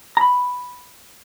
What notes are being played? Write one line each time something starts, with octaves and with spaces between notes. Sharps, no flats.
A#5 B5